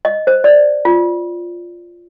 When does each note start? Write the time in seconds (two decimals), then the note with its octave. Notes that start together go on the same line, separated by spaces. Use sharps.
0.05 D#5
0.27 C5
0.44 D5
0.85 F4